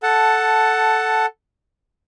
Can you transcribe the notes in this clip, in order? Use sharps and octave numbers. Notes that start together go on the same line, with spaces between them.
A4 F#5 A5